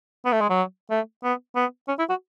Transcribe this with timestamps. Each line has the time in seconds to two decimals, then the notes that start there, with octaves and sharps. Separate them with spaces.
0.25 B3
0.32 A3
0.41 G#3
0.50 F#3
0.90 A3
1.23 B3
1.55 B3
1.88 C#4
1.99 E4
2.09 F#4